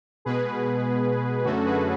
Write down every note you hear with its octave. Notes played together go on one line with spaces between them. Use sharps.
B2 G#3 B3 G#4 B4
F#2 D3 A3 C#4 F#4 A4
G#4 B4